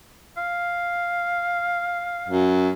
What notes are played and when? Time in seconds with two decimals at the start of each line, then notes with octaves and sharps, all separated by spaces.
0.37 F5
2.28 F#2